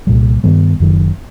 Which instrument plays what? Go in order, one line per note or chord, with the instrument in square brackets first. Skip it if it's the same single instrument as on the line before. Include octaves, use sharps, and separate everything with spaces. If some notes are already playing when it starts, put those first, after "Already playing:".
[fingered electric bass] C2 A#2 G3
G2 D#3 G3 B3
F#1 F#2 D#3